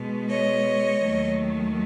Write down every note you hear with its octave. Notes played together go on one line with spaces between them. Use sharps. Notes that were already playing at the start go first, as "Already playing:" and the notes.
Already playing: B2 G#3
C#5 D#5
D#2 D#3 F#3 A3